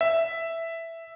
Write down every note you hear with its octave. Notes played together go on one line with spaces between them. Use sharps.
E5